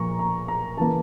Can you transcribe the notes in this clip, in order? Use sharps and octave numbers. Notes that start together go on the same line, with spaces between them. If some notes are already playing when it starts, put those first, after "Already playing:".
Already playing: A#2 F3 A#3 A#5 C#6
A#5
A#5
C#3 E3 A#3 A5